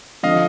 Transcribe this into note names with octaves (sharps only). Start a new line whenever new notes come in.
D3 F3 D#5 F5